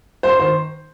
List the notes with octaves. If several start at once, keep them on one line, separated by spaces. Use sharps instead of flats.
G2 C5
D#3 C5